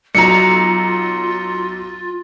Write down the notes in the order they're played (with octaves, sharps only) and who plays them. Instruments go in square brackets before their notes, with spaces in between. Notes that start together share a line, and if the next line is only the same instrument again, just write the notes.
[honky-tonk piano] B1 F#3 A#5 [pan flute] F4 [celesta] C#7